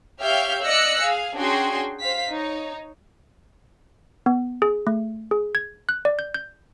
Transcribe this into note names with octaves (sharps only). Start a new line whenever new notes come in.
G4 C#5 E5 F5 F6 G6
D5 D#5 E6 F#6 A#6 C#7
G#4 F5
C#4 D4 F#4 G#4 G5 C6
C5 F5 B6
D#4 C#5
B3
G#4
A3
G#4
G#6
F#6
D5
G6
G6